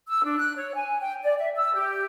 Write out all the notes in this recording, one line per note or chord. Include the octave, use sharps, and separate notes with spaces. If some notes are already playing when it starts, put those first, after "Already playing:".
E6
D4
F#6
C#5
G#5
G5
D5
E5
E6
G4